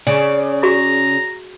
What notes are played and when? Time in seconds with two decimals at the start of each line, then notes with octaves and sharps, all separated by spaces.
0.07 C#3 D5
0.63 F#4 G#4 A#5 C#6